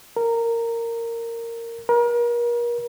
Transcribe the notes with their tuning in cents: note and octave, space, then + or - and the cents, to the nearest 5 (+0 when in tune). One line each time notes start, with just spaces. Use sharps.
A#4 -15
A#4 +35